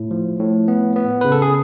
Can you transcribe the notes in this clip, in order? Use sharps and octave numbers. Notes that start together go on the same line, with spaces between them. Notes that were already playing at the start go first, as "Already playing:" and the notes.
Already playing: A2
F3
A2
B3
B3
C#3 B4
A4
G#4